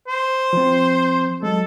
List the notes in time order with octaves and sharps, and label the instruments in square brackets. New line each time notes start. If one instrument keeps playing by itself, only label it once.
[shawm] C5
[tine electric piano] F3 C4
[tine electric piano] F#3 G#3 [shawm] A4